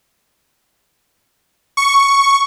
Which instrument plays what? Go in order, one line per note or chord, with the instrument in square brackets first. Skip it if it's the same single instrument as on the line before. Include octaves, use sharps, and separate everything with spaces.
[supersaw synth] C#6